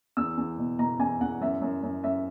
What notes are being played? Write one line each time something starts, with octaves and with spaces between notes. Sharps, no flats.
E2 E6
E2
B2
B2 A#5
E2 G#5
E2 F#5
F#2 E5
F#2
F#2
F#2 E5